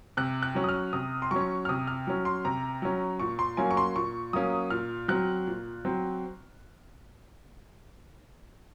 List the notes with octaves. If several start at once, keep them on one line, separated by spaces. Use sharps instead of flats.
C3 F#6
F#6
F#3 C#4
D#6
F6
C3 D#6
C6
F#3 C#4 C#6
F6
C3 D#6
F6
F#3 C#4
C6
C3 A#5
F#3 C#4
A#2 C#6
C6
F#3 A#3 C#4 G#5
C#6
C6
A#2 C#6
F#3 A#3 C#4 D#6
A#2 F6
F#3 C4 F#6
A#2
F#3 C4